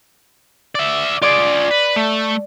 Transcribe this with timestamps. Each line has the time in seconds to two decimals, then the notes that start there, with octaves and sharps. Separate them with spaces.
0.75 D5 E5
1.22 F4 G#4 D5 D6
1.71 B4
1.96 A3